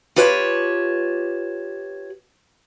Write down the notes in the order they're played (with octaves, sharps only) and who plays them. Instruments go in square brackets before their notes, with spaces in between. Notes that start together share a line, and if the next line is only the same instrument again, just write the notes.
[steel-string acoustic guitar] F4 G4 B4 C#5 G#5 A5